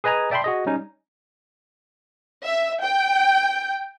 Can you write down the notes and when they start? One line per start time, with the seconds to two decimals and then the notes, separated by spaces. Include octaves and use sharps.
0.04 G#4 B4 D#5 G#5 A#5
0.31 D5 E5 G5 A5 B5 C6
0.44 F#4 G#4 D#5
0.66 G3 C#4 D#4
2.44 E5
2.82 G5